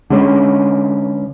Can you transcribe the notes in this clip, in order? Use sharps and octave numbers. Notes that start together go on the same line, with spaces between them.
D3 G#3 C#4